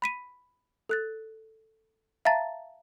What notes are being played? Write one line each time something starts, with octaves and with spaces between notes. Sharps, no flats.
B5 B6 D#7
A4 F#6 A6
E5 F5 A5 A#5 A6